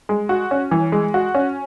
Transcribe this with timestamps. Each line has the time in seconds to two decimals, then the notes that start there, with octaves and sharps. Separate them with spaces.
0.09 G#3
0.29 F#4
0.51 C#4
0.71 E3
0.92 G#3
1.14 F#4
1.35 C#4